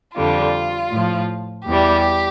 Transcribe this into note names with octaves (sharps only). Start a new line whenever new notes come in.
F2 D3 G3 F4
A2 F3
E2 E3 G3 G4